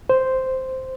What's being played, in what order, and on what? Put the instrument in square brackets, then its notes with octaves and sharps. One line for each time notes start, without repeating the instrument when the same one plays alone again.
[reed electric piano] C5